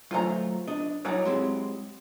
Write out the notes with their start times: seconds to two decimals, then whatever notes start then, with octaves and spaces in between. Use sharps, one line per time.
0.11 F#3 A3 F4 C5 A#5
0.67 D4 D#5
1.05 F#3 D#4 E4 C#5 D5
1.25 G#3 C4 G4